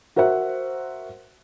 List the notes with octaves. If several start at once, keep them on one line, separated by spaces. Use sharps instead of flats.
F#4 A#4 C5 E5 F#5